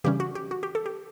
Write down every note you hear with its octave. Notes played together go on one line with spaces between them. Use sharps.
C#3 E3 G3 C#4 G4
F#4
G4
F#4
G4
A4
G4